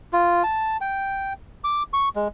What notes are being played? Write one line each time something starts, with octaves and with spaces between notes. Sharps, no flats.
F4
A5
G5
D6
C#6
G#3